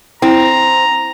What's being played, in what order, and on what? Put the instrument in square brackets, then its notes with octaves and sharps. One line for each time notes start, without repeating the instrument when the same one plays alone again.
[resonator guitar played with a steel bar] C4 [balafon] E4 [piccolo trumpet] A#5